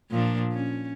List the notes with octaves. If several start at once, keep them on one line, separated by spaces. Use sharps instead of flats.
A#2 F3 D4
C#4